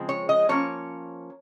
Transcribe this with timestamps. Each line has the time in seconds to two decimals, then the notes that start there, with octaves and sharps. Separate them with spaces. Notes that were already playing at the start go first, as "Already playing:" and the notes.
Already playing: C#3 F3 G#3 C4
0.09 C#5
0.29 D#5
0.49 F3 A#3 C#4 C#5